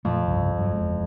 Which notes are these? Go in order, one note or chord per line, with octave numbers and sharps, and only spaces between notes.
F2 A#2 F3 A3
C2 G2 C#3
G2 F#3
F#1 E2 G#3